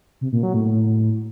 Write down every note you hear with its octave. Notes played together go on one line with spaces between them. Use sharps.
C3
A#2
F#3
A2